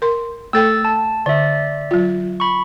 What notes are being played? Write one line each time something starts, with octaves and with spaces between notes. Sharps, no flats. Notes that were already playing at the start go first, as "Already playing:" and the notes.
A#4 C6
A3 A4 G5 E6 A6
A5
D3 D5 E5
F#3 F4
B5 C#6